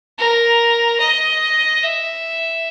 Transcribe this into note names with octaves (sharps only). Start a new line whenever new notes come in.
A#4
D#5
E5